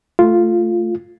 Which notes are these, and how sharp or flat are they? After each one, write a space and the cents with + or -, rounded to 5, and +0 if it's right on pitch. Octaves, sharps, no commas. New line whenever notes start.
A3 +0 F4 +0